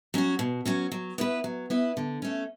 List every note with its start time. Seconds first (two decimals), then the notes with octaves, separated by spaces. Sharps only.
0.14 F#3 C#4 F#4
0.39 B2
0.65 F#3 C#4 F#4
0.92 F#3
1.18 B3 E4 B4
1.44 F#3
1.70 B3 E4 B4
1.97 D3
2.22 A3 C#4